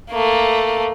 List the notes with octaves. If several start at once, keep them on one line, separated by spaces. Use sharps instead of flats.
A3 A#3